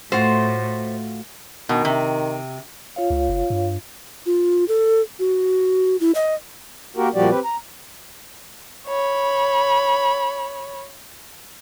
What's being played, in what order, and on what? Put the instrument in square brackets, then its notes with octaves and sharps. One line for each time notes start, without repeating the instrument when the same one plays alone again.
[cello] A2 A3 [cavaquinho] F4 F#4 [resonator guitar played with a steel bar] C5
[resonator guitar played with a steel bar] B2 [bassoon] D#3
[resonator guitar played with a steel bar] C3
[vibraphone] F4 C#5 F5
[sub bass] C#2
F#1
G2
[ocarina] F4
A4
F#4
E4
D#5
[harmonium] A#3 F#4 G4 A#4
A#2 F3 G3 F#4 G4 D5
C4 G4 B4
A#5
[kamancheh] C#5 B5